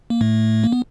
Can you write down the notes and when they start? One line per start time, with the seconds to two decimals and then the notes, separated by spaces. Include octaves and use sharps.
0.10 A#3
0.21 A2 A3
0.64 A#3
0.72 B3